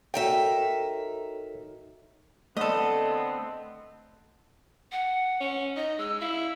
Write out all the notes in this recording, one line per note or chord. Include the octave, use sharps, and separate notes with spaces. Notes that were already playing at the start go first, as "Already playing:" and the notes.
D#4 F#4 A4 A#4 C#5 E5 G5
D3 A3 B3 C4 A4 D#5
F#5
C#4
D#4 D#5
G#3 E6
E4 F5